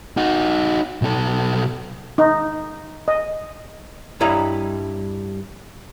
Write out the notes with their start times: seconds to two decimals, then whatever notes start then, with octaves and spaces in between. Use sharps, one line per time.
0.17 D#4 F#4
1.02 B1 A4
2.18 D#4
3.08 D#5
4.21 G2 G3 E4 C#5 D#5 A#5